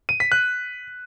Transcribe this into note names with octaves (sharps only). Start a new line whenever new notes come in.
D#7
B6
F#6